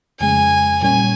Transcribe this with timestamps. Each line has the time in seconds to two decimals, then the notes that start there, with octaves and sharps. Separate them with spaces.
0.20 F2 C#3 G#3 G#5
0.82 A#2 G3 C#4 G#5